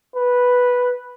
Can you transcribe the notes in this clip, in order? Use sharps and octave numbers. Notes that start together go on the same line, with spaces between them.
B4